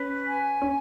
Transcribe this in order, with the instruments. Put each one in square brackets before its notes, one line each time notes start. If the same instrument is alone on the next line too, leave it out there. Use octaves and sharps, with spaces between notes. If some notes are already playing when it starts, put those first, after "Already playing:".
Already playing: [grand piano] C#4 [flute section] B4
[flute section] G#5
[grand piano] C#4